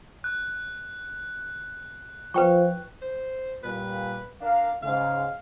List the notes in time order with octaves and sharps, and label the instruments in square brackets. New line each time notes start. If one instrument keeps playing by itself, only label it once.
[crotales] F#6
[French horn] F3 [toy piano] B4 G5 C#6
[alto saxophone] C5
[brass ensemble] A#2 G3 [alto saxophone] B4
[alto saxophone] D4 [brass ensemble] A#4 F5
[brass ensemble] G#2 C#3 [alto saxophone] F5